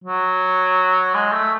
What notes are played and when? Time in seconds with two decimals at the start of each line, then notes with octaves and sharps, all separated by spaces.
0.04 F#3
1.14 G#3
1.33 A3